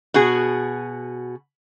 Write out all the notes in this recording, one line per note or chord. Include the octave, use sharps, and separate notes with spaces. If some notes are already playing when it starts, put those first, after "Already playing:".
B2 F#4 G#4